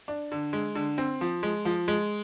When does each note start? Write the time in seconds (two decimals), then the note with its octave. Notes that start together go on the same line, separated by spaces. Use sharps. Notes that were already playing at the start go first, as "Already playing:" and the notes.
0.08 D4
0.32 D3
0.53 G#3
0.75 D3
0.98 C4
1.21 F3
1.43 G#3
1.65 F3
1.88 G#3